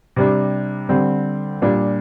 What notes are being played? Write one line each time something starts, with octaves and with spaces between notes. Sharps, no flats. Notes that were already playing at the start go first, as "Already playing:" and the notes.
C3 G3 D4
D3 G3 C4
A#2 G3 D4